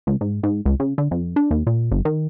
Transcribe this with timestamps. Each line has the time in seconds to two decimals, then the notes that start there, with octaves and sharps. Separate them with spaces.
0.07 C#2
0.21 G#2
0.43 G#2
0.65 C#2
0.80 C#3
0.98 D3
1.11 F2
1.36 D4
1.51 D#2
1.67 A#2
1.91 G1
2.05 D#3